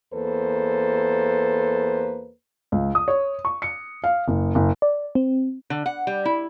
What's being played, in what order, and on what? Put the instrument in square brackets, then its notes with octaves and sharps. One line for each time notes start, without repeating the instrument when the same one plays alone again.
[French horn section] E2 A#3 A4 B4 C5
[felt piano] C#2
D#6
C#5
C#6
C#7
F5
F#1
F#1
[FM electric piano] D5
C4
[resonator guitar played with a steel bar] D3
F#5
G3
E4